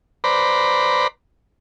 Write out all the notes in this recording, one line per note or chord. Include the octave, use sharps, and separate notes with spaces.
B4 C5 D5 A#5 B5